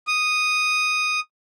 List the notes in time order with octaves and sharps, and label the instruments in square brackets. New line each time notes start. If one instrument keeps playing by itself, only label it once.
[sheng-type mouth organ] D#6